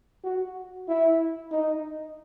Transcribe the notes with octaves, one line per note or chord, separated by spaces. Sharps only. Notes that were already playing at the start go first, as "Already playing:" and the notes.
F#4
E4
D#4